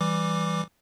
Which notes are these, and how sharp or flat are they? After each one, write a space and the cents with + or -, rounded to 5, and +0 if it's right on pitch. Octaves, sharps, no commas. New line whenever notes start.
E3 +5 G3 +0 D6 +0